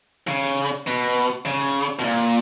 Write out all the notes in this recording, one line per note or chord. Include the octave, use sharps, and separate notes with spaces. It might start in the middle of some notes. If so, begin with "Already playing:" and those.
C#3
B2
C#3
B2
A#2